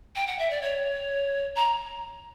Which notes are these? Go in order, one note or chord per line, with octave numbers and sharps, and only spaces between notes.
G5
F#5
E5
D5
C#5
A#5